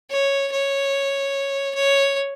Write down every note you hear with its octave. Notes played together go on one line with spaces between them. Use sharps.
C#5
C#5
C#5